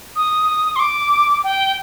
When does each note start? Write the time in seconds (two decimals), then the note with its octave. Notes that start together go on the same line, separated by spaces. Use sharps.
0.16 D#6
0.76 C6
0.80 D6
1.44 G5